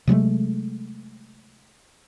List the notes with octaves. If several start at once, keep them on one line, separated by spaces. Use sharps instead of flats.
C3 F#3 G#3 A3